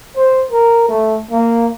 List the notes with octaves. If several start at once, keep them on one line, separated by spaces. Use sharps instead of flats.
C5
A#4
A3
A#3